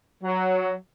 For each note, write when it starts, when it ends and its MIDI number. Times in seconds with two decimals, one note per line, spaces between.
0.23 0.73 54